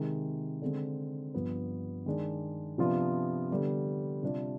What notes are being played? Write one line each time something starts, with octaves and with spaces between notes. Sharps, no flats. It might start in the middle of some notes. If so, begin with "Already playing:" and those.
Already playing: C3 D#3 G#3
D3 G#3 C4
G2 F3 B3
D#3 G#3 D4
C3 F3 B3 D4 F4
D3 G3 B3
C3 G3 D4 F4